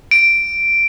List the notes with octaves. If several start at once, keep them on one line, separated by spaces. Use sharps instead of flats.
D7